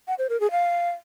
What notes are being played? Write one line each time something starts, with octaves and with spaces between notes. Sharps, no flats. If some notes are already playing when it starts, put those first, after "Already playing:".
F#5
C5
A#4
G#4
F5